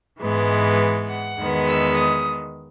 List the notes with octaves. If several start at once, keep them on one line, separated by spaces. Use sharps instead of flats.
G#2 E3 G#3 B3
F#5
E2 D#3 G#3 B3
E6
D#6